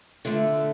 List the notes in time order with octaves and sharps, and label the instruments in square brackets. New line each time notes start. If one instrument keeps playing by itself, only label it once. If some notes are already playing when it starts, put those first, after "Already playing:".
[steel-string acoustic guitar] D3 A3 F4